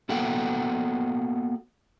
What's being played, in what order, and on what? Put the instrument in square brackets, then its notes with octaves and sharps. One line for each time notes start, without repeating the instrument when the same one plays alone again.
[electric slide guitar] A#3 B3 F#4 A4 F#5 G5